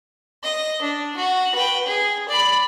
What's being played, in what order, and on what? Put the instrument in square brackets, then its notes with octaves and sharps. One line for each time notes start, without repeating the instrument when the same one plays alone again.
[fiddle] D#5
D4
F#4
B4 G5
G#4
D5 B5